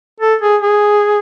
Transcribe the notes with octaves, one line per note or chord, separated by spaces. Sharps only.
A4
G#4
G#4